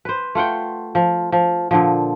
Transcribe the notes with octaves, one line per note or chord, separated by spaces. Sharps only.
B4 C5
A3 F4 F#5 G5
F3
F3
A#2 D3 F3